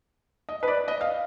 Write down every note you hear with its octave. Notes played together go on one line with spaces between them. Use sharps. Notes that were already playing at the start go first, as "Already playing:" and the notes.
D#5
B4
D5
D#5
F5